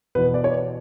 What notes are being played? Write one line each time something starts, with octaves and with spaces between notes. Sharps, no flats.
E2 B2 B4
D5
C#5